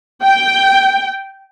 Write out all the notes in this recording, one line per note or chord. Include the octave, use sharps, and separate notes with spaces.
G5